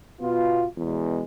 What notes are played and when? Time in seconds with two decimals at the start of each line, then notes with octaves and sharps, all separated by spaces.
0.20 B2 B3 F4
0.77 E2 B2 G#3